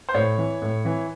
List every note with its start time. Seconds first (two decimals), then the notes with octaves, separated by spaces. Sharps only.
0.09 C5
0.14 A2 C#5
0.38 E3
0.62 A2
0.85 E3